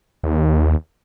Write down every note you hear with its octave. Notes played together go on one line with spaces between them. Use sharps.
D#2